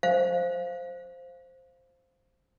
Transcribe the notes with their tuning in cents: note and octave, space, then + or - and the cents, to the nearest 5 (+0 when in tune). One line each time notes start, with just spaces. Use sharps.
C5 +0 F5 +0